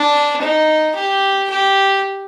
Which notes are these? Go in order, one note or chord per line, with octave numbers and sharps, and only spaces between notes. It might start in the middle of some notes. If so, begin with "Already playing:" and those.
Already playing: D4
D#4
G4
G4